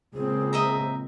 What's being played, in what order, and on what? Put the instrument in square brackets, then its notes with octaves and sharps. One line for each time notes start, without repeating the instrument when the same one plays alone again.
[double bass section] C#2 A#2 C4 [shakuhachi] G#4
[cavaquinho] D#5 E5 A#5